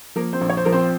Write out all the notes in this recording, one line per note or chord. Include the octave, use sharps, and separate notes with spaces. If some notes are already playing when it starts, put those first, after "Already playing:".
F3 A#3 A#4
C4 C5
A#1
C#5
C5
F3 A#4
C4 C5